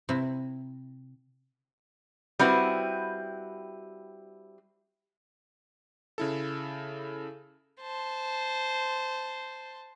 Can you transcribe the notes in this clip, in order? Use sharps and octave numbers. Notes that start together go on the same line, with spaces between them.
C3 E4
G3 C4 E4 F#4 B4
C#3 E4 A4
C5 A5